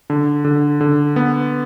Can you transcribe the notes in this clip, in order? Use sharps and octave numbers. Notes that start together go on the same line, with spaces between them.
D3
D3
D3
B3